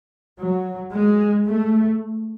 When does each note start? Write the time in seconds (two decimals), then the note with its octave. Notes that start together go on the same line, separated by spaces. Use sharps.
0.39 F#3
0.93 G#3
1.47 A3